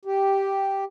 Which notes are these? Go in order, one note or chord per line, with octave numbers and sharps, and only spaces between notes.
G4